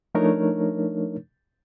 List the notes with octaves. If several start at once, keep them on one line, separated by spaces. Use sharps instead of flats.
F3 A3 D4 D#4 A#4 C#5